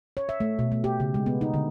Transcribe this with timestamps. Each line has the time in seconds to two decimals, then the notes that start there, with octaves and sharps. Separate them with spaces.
0.17 C#5
0.29 E5
0.40 A3
0.59 B2
0.72 A3
0.84 G4
1.00 C#3
1.14 G#3
1.26 B3
1.41 D#4
1.54 D3